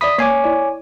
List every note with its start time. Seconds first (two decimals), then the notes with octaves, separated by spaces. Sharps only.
0.01 D5 E5 B5 D#6 B6
0.18 A#3 C#5 G#5 D6 B6 C7
0.44 E4 D5